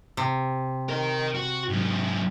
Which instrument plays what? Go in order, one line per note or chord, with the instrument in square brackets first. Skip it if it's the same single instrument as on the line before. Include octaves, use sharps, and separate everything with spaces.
[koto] C3
[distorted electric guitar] A#4 D#5
F#4
G#2 F#3